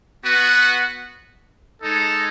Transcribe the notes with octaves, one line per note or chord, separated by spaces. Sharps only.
B3 F#4 B4 F#5
G#3 D#4 A4